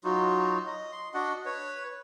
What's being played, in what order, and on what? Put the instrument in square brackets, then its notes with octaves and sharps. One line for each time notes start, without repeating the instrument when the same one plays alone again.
[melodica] F#3 D#4 F4 F#4
D#5
C6
D4 F#4 D#5 F#5
B4 C#5